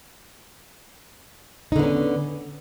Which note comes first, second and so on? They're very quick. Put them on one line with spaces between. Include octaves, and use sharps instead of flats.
D#4 D3 B3 C#4